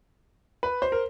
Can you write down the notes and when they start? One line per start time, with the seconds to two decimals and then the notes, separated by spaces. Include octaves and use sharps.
0.63 B4
0.82 C5
0.92 A#4